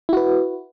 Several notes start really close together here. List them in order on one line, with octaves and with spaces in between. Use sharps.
E4 F#4 B4